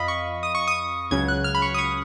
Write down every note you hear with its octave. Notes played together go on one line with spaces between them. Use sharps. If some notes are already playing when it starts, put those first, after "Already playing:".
Already playing: F2 D#5 F5 B5
C#6
D#6
C#6
D#6
C#2 C#3 F#3 G#6
F#6
F6
B5
C#6
D#6
C#6